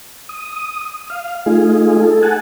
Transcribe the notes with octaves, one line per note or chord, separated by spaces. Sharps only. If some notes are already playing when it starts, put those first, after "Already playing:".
D#6
F5
A3 D#4 F4 G#4
A4
F#5 G#5 A5